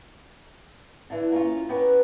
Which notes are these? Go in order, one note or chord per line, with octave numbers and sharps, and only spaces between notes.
D3 E3
A#3 C#4 F4
B3 C#4 G4 A#4 B4